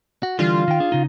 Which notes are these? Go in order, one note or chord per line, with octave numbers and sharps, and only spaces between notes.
F#4
D3 E3 G3 F4
D#3 G5
D4 G#4
C#3 D#4